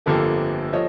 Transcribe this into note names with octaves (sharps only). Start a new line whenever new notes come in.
G1 F2 D3 F3 A#3 G4 A4
F3 C#5 D#5